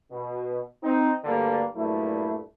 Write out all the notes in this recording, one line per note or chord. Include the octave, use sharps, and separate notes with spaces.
B2
C4 D#4
D2 G2 D3 G3 A#3 D4
G2 A#2 F#3 A3 E4